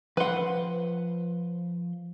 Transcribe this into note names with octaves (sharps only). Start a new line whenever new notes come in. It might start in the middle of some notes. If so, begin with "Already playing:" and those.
F3 B4 F#5 C6